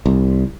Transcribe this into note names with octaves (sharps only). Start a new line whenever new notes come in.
C2